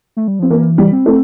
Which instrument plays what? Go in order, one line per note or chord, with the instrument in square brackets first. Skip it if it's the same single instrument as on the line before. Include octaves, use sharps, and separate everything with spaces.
[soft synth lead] A3
G3
[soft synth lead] F3 [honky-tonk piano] C4
[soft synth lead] E3 [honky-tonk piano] A#3
[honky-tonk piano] G3
[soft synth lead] C4
[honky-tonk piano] A3